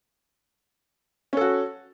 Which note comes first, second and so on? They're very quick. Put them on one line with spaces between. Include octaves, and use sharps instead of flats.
C#4 A4 F#4